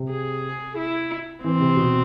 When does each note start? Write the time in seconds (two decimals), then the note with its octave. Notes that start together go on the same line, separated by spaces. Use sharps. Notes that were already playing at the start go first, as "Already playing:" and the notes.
Already playing: C3
0.11 G#4
0.78 E4
1.44 E3 C4
1.60 C3
1.77 B2